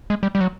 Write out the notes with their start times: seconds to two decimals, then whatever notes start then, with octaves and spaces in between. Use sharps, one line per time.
0.10 G#3
0.23 G3
0.35 G3
0.41 F#3